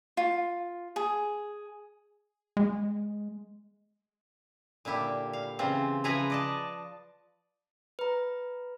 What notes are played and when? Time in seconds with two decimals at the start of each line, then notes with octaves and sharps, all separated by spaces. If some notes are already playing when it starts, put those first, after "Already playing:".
0.17 F4
0.96 G#4
2.57 G#3
4.85 A#2 D3 E4 G4
5.33 F5
5.59 C#3 E3 C4 F4
6.04 C#3 F3 E4 B4 G#5 A#5
6.30 D5 D#5 A5
7.99 B4 A#5